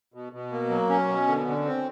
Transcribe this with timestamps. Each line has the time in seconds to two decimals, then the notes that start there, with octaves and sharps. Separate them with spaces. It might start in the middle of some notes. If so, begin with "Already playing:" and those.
0.14 B2
0.33 B2
0.52 A#3
0.70 F#3
0.89 C#4
1.09 B2
1.27 D3
1.46 D3
1.65 C4